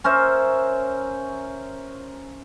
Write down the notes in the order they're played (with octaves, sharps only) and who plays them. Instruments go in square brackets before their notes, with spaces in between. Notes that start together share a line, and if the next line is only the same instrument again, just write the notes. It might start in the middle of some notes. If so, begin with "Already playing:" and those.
[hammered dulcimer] C#4 A#4 C5 E5